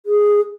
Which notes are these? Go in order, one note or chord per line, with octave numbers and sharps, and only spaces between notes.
G#4